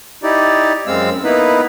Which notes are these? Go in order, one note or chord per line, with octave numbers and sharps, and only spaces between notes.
D#4 E4 G4 D5
F#2 G#3 C4 F5 E6
A#3 B3 D#4 E4 B4